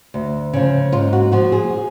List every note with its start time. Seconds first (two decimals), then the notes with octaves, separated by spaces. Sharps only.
0.14 D2
0.54 C#3 F3
0.93 G#2 F4
1.13 F#4
1.32 F3 F#4
1.52 G#4